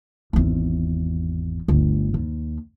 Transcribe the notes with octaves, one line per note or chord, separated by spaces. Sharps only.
G#1 E2
G1 D2
D#2